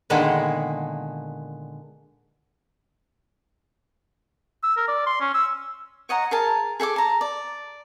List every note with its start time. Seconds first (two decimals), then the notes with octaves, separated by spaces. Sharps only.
0.10 A#2 D3 D#3 G#3 A#3 B3
4.63 E6
4.77 A#4
4.88 D5
5.06 C6
5.20 C#4
5.34 E6
6.09 C#5 D#5 F#5 A#5
6.31 G#4 A#4 A5
6.80 G#4 A4 G5 D6
6.96 A5 A#5
7.21 D5